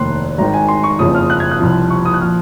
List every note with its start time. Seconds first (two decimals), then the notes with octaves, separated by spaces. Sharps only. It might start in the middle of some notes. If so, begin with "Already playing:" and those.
Already playing: F1 D#2 D#3 C6 F#6
0.38 G#1 G#2 D#3 A#5
0.54 G#5
0.68 C6
0.84 C#6
0.99 F#1 F2 C#3 F3 D#6
1.15 F6
1.30 F#6
1.40 G#6
1.51 F#6
1.60 C2 C3 F3
1.90 C#6
2.05 D#6
2.14 F#6
2.21 A#2 F3 F6